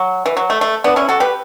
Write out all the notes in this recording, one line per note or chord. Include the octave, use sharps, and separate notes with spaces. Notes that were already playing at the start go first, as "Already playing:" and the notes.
Already playing: F#3
E3
F#3
A3
A3
B3 D4
C#4 E4
F#4 A4
G4 B4